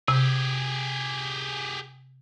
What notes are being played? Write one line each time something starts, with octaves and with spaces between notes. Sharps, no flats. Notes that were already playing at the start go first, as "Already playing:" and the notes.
C3 G4 G#4